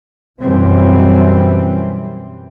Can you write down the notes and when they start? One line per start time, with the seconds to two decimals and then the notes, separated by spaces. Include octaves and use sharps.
0.41 F#2 B2 E3 G3 C4